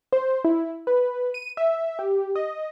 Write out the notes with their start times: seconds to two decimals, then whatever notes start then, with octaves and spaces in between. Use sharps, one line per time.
0.13 C5
0.45 E4
0.87 B4
1.34 D#7
1.57 E5
1.99 G4
2.36 D#5